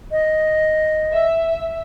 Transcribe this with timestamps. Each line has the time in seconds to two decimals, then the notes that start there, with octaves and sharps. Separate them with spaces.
0.12 D#5
1.12 E5